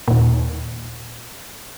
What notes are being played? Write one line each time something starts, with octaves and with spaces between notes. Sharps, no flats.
D#2 A#2